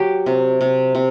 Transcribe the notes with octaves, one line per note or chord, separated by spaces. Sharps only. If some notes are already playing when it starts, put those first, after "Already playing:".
Already playing: F#3 G4
C3
C3
C3